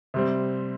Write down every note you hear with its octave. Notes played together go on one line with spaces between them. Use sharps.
C3 G3 C4